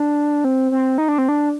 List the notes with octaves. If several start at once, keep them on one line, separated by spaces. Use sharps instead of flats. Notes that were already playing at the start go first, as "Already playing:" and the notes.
Already playing: D4
C4
C4
D#4
D4
C4
D4